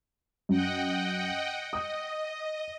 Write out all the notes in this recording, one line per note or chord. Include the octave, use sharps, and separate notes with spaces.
F#2 D#5 F#5 G5
D#5 D#6